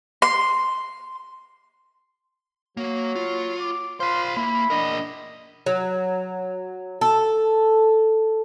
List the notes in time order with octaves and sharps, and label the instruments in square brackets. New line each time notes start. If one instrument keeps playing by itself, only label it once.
[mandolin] C6
[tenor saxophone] F#3 [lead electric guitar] A#3
[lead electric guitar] F4
[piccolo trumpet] D6
[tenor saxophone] F4 [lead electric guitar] C5 B5 [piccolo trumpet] C6
[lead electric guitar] A#3 [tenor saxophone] E4 [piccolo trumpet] B5
[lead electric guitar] D4 A#4 [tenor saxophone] D#5
[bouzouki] F#3
A4